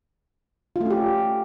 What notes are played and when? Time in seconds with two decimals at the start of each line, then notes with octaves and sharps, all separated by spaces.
0.76 F4
0.81 A3
0.86 C#4
0.91 G4